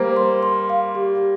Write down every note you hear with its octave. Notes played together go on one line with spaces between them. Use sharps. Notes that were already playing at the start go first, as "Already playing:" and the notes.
Already playing: G3 A#3 C5
C6
C6
F5
G4